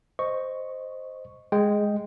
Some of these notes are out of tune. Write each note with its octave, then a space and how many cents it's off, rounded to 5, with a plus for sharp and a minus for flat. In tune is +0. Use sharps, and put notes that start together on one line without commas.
C5 +0 D#5 -5 C#6 +0
G#3 +0 G5 +0